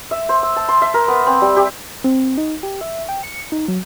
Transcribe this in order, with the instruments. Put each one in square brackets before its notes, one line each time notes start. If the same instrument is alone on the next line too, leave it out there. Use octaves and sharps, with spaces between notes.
[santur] E5
C5
E6
A5
C6
E5
A#4
B3
C4
G3
G4
[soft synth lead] C4
D#4
G4
E5
G5
C#7
D#4
F#3